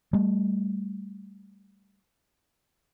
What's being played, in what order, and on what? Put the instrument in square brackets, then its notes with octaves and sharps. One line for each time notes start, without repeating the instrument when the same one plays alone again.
[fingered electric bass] G3 A3